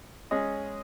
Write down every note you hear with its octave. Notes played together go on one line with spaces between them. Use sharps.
G#3 C#4 G#4 D#5